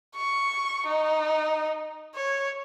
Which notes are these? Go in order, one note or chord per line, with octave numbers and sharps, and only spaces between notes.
C#6
D#4
C#5